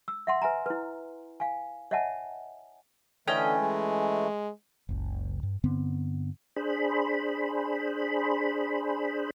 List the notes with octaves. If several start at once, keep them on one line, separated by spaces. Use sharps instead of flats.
E6
E5 F#5 C6
B4 E5 G#5 A#5
E4 B4
F5 G#5
C#5 D#5 E5 F#5 G#5 A5
D3 E3 A3 C#4 D#5 G5
G#3
F#1 C#2
G2
G2 D3 B3 C4
D4 G#4 C5 B5